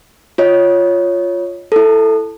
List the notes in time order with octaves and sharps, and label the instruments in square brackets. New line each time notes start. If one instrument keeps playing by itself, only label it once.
[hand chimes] F4 C#5 D#5
E4 A4